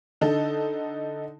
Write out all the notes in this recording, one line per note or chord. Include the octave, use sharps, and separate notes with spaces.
D3 D#4 A4